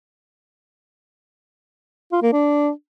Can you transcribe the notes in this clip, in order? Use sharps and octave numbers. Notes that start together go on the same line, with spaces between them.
F4
A#3
D4